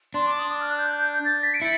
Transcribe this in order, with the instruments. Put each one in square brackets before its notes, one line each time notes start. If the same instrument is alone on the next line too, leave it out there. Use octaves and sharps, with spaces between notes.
[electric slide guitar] D4 [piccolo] C6
[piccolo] D6
D#6
D6
F6
F#6
G6
A6
B6
D7
[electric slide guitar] E4 [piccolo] C#7